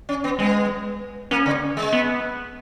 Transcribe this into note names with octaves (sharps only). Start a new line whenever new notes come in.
C#4
B3
G#3 B3
A#3 C#4
C#3
G#3
B3